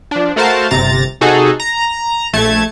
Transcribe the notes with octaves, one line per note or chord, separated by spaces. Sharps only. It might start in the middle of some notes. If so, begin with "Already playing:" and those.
F3 D4
A3 F#4 A#4 C5 F5 A5
G1 C3 A#5 A6
C3 D#4 F#4 G#4 A4
A#5
A#1 A3 A5 G#6